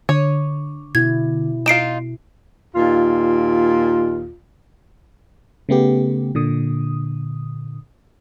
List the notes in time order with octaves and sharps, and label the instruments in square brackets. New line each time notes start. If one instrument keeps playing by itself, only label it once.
[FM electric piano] D3 [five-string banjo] C#5
[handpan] B2 E4 [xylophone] G#6
[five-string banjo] D#4 F4 [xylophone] C7 D7 E7
[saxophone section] D#2 A#2 F4
[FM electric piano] C#3 A3 B3 G4
A#2 D3 D#6